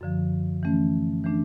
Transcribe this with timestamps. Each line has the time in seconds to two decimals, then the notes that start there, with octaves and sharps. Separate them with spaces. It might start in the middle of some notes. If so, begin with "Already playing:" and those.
0.01 F#2 D3 F3
0.63 E3 A3 C#4
1.24 E3 A3 D4